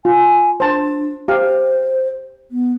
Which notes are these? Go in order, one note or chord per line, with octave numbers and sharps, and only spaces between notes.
F4 G#5
D4 C5 A5
G4 C5 F5
B3